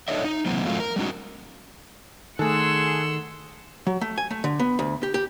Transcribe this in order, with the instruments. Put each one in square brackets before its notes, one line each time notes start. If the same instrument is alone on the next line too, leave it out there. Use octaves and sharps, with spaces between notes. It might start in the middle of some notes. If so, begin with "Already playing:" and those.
[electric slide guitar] D4 D#4 A4 C#5 D#5 E5
D#4
C3 E3 F#3 A#3 C4
F#2 A2 F#3 A3 C4 F4
A#4
G3 A3 C#4 D#4 F#4
[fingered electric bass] D#3 [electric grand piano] A3 A4 [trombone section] G#4 [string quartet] F#5 C6 E6
[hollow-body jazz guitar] F#3
A3
G#5
A3
D3
B3
D2
G4
G4